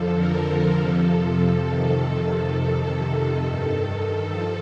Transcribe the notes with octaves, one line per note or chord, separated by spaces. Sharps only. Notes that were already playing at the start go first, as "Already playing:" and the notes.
Already playing: F2 D3 F3 A4
A#4
A#4
F2 C3 F3 A4
F2 C3 D#3
F2 C3 D#3
G2 D#3
F3 A4